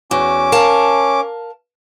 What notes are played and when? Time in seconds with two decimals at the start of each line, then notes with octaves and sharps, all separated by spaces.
0.11 E2 C#4 F#4 D6
0.52 A#4 F5 A5